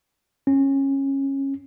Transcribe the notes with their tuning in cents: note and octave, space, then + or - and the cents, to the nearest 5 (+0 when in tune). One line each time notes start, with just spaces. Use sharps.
C#4 -20